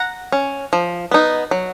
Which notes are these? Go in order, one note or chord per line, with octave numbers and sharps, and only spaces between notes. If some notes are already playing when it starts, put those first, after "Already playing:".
Already playing: F#5 A#5
C#4
F3
B3 D#4
F#3